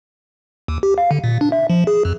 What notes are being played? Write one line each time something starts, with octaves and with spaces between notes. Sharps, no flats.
D#2
G4
F5
D3
A#2
D4
E5
F3
G#4
F2